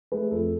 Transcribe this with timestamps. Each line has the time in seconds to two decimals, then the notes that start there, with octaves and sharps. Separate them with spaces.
0.12 A3 G#4 B4
0.31 F2 A4